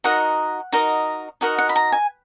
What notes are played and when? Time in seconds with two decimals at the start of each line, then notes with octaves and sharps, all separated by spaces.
0.04 D#4 F#4 A#4 D#5 F#5
0.72 D#4 F#4 A#4 D#5
1.41 D#4 F#4 A#4 D#5 F#5
1.58 F#5
1.69 B5
1.76 A#5
1.92 G#5